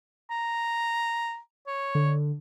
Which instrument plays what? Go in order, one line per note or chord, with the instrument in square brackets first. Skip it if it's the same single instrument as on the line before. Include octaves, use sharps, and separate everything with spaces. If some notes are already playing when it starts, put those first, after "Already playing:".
[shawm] A#5
C#5
[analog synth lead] D3